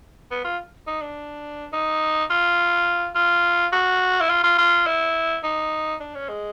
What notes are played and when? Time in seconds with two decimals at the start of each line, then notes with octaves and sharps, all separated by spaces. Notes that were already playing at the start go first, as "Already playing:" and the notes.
0.31 B3
0.44 F4
0.87 D#4
1.02 D4
1.73 D#4
2.30 F4
3.15 F4
3.73 F#4
4.21 E4
4.30 F4
4.44 F4
4.58 F4
4.87 E4
5.44 D#4
6.00 D4
6.15 C#4
6.29 G#3